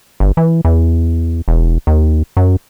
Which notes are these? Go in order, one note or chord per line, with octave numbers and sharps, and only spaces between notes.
G1
E3
E2
E1
D#2
F#2